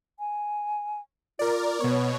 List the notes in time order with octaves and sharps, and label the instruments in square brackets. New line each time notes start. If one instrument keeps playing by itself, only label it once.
[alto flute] G#5
[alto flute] F4 [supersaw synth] A#4 D5
[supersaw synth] B2 C#5 [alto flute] B3